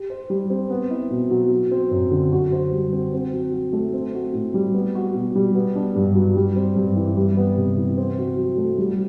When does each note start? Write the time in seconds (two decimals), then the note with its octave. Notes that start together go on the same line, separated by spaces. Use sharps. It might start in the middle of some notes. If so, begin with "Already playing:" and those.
Already playing: G4
0.10 C5
0.30 G3
0.50 C4
0.70 B3
0.90 E4
1.10 B2
1.31 F#3
1.51 F#3
1.71 C4
1.91 F#2
2.11 D3
2.32 F#4
2.52 C5
2.73 G3
2.92 C4
3.13 C4
3.33 F#3
3.53 F#3
3.73 A3
3.93 C4
4.14 F#4
4.34 A2
4.54 G3
4.74 B3
4.95 F#4
5.15 B2
5.35 G3
5.55 B3
5.75 D4
5.96 G2
6.15 F#3
6.36 G3
6.56 C4
6.76 G2
6.96 E3
7.17 G3
7.37 B3
7.57 C3
7.78 E3
7.97 C4
8.18 F#4
8.38 F#3
8.58 A3
8.78 G3